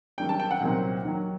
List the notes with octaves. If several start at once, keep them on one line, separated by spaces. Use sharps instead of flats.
F#2 D#3 G3 D4 G5
A5
G5
F#5
C2 A#2 F#3 C4 D#4
D#2 D#3 F#3